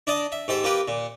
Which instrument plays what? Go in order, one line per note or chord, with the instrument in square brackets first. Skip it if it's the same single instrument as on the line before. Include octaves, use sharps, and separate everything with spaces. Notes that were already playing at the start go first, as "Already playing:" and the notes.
[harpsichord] D4 D5 D#5 A5
E5
G#2 G4 A4 C5
A#3 F4 G4 B4
A#2